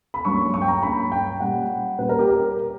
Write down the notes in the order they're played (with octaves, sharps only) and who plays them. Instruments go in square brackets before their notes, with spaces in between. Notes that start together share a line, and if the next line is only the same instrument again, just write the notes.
[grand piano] B5
G2 F#3 A#3 C#4 C#6
C#6
G5
A#5
G2 F#3 A#3 C#4 B5
G5
A#2 G3 C#4 F#5
A#2 G3 C#4 B4
A#4
G4
A#4